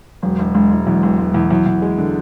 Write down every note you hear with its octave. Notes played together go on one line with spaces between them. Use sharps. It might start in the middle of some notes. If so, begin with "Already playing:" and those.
E1 F#3
E1
E1 G#3
E1
E2 F#3
E1
E1
E2
E2 F#3
E2
G#3
D3